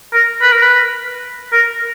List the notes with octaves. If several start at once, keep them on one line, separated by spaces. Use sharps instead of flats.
A#4
B4
A#4
B4
A#4